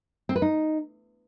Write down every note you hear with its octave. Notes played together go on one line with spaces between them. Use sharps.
C4
B4
D#4